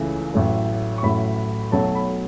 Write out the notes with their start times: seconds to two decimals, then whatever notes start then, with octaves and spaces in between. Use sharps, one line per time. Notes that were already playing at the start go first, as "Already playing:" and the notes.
Already playing: C#2 C#3 E3 A3 E5
0.34 A1 A2 F#3 A3
0.98 C#6
1.03 A1 A2 F#3 A3 B5
1.72 B1 B2 F#3 A3 A5
1.95 B5